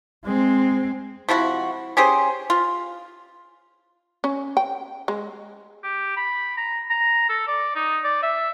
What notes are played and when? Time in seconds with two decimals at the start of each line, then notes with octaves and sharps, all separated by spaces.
0.25 G#3 C4
1.29 C3 F3 E4 F#4
1.97 C#4 G4 G#4 C5
2.50 F4
4.24 C#4
4.57 G5
5.08 G#3
5.83 G4
6.17 B5
6.57 A#5
6.90 A#5
7.29 A4
7.48 D5
7.76 D#4
8.04 D5
8.23 E5